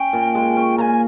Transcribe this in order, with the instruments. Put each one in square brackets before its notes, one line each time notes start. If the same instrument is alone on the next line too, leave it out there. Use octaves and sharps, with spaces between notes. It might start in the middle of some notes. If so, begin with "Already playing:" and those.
Already playing: [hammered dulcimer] C#4 [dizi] G5
[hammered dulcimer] A#2
G#3
C#4
[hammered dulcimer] A#2 [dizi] G#5 A#5